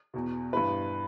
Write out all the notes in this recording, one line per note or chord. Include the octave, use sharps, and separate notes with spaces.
E2 B2
G2 E3 B4